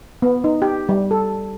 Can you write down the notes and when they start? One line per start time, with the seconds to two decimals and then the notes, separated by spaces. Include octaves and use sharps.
0.22 B3
0.44 D#4
0.62 G4
0.89 G3
1.11 A4